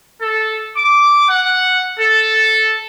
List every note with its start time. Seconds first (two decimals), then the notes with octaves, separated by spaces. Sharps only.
0.22 A4
0.77 D6
1.29 F#5
2.00 A4